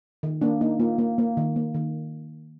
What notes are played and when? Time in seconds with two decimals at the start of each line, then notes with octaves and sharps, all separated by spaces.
0.23 D#3
0.41 A#3 D4
0.61 A#3 D#4
0.80 A#3 F4
0.98 A#3
1.18 A#3
1.37 D#3
1.56 A#3
1.74 D#3